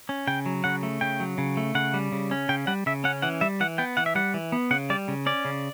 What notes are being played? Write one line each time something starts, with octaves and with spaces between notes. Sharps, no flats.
C#4
C#3 G5
F#3
C#3 F#5
A3
C#3 G5
F#3
C#3
A3
C#3 F#5
G3
C#3
C#4
C#3 G5
G3 F#5
C#3 E5
C#4 F#5
E3 F#5
G3 E5
E3 F#5
B3 G5
E3 F#5
E5
G3 F#5
E3
B3
C#3 F#5
G3 D5
C#3
C#4 D5
C#3